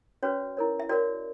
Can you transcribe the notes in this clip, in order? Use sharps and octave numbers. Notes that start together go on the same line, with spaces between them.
C#4 F#4 B4 C#5
E4 A#4 C#5
E5
F#4 A#4 C#5 D5